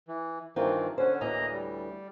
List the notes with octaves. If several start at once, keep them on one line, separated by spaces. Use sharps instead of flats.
E3
G2 D#3 E3 C4 F4 A#4
D3 C#4 C5 F#5
D2 A2 E3 A#3 D#5 A#5
G3